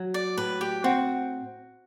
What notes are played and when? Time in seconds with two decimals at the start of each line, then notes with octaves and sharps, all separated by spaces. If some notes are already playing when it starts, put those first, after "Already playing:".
Already playing: F#3
0.14 D5
0.37 A2 B4
0.61 G4
0.84 C4 F#4